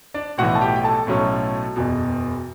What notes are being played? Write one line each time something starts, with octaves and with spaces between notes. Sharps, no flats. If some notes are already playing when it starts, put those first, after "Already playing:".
D4 D5
B1 A2 E3 F#4 F#5
A5
G4 G5
G5
A4 A5
B1 A2 F#3 C#4
F#1 E2 B2